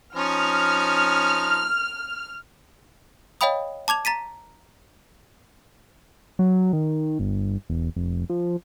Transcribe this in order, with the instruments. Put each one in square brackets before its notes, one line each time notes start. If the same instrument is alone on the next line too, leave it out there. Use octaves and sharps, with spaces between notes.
[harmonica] F3 C#4 D#4 [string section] F6
[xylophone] C#5 D#5 F5 G5 B5 D#6
A5 D6 G#6 F7
A#5 A6 B6 D#7
[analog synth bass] F#3
D#3
G1
E1
F1
F3